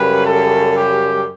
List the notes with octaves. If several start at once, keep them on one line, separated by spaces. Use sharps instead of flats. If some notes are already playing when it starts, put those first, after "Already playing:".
Already playing: F#2 C#3 G3 B4
A4
G4